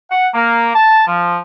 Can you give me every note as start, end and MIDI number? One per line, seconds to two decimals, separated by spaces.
0.11 0.28 78
0.34 0.70 58
0.75 1.05 81
1.07 1.40 53